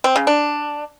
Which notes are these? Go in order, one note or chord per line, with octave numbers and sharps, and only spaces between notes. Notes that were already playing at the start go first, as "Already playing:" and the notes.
C4
C#3
D4